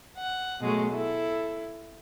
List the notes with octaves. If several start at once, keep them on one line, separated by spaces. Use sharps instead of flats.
F#5
B2 F#3 G#3 A3
E4 A4